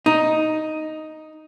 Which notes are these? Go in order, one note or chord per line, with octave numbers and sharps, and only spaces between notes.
D#4